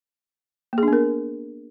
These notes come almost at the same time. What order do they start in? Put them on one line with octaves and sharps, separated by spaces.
A#3 G#4 D4 B3 A#4